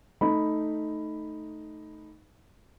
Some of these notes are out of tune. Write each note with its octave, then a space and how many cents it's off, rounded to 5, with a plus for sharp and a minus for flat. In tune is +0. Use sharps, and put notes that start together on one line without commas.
A3 +0 D#4 +0 B5 +0